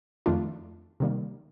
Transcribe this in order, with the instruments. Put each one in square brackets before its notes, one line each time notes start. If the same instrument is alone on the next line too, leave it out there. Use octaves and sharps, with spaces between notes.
[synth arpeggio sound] F2 D#3 A3 D4 F4
C3 D#3 G3 A#3